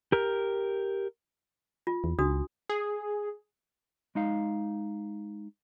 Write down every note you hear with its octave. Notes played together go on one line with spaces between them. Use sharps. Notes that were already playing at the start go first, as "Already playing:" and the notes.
G4 A#4
F4
E2
C#2 D4 F#4 D#6
G#4
G#3 D#4 F5